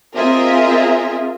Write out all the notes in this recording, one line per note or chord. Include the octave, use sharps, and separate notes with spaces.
C4 F4 G#4 A#4 D#5 E5